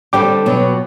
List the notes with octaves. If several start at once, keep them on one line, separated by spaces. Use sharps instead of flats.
D3 G3 C4 G5 D6
B2 F#3